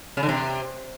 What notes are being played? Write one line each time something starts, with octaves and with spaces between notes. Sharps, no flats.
C#3
D3
C3